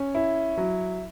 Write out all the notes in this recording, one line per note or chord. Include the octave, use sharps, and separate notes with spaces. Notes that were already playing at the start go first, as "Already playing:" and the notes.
Already playing: C#4
E4
F#3